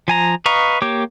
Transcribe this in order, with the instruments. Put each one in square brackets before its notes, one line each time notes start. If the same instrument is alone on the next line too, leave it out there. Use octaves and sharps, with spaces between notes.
[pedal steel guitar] F3 G#5 A#5
B4 D#5 F5 A#5 C#6
A#3 G4 C#5 D6